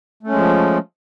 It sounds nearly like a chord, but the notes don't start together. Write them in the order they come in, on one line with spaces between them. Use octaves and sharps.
A3 C#4 G#3 F3